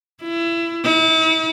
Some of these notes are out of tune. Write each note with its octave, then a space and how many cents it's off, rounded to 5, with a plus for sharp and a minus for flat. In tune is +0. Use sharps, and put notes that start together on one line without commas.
E4 +25
E4 -40